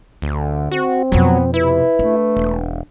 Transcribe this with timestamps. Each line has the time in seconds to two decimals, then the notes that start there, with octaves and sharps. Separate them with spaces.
0.22 D2 D3
0.72 C4 F#4
1.12 F2 B2 F#3 B3
1.54 C3 E4 B4
1.99 A3 D4
2.37 E1